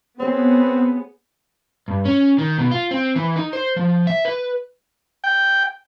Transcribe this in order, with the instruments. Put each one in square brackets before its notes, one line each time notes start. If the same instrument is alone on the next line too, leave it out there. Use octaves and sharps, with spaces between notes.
[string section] B3 [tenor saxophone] C4 [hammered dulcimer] G#4 C#5
[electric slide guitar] G2
C#4
D#3
B2
F4
C4
E3
D#4
C5
F3
E5
B4
[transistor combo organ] G5